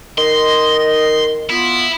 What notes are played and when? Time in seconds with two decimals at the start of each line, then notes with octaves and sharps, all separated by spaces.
0.18 D#3 D#5 C6
1.50 B3 E4 F4